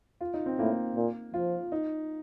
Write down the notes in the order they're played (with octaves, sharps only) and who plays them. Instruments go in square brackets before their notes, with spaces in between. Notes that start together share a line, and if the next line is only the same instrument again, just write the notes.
[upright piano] F4
D#4
C4
[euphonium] A2 [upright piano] A#3
[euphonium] A#2
[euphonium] F3 [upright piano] F4
[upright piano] D#4